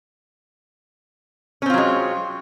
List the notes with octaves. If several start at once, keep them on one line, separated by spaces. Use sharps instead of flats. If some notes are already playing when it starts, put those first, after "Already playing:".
F#3 G#3 C4 C#4 F4